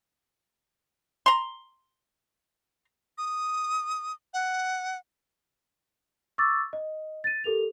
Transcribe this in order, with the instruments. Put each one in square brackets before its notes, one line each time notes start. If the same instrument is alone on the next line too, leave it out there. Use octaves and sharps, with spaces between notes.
[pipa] A#5 C6
[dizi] D#6
F#5
[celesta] C#6 D6 E6 A6
D#5
A6 D#7
G4 A4 A#4 F7